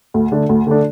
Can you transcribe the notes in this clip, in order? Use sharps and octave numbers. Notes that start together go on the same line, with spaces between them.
D2
D3 A3 D4
D2
D3 A3 D4